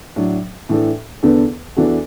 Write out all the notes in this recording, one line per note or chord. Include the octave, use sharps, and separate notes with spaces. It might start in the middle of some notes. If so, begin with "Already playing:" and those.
A2 F#3 D4 F#4
A2 E3 D4 A4
E2 D3 B3 D4 A4
E2 E3 D4 F#4 A4